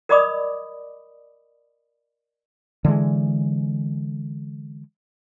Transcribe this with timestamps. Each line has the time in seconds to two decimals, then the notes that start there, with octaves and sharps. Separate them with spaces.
0.09 A#4 D5 D#5 B5 D6 D#6
2.85 D3 E3 G#3